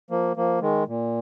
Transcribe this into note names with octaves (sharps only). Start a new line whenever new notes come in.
F3 A#3
F3 A#3
D#3 G#3
A#2